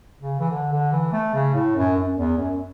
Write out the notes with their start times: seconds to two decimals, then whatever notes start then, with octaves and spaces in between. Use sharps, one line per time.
0.20 C#3
0.39 E3
0.50 D3
0.72 D3
0.92 E3
1.13 A3
1.34 C#3
1.54 A2
1.76 F#2
1.97 F#2
2.18 E2
2.38 F#2